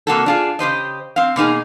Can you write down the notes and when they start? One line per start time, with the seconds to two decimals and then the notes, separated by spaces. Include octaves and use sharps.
0.07 C3 A#3 F#4 A4
0.26 D4 F4 G#4
0.59 C#3 G4 C5 D#5
1.16 C4 F5
1.36 B2 A#3 D#4 G#4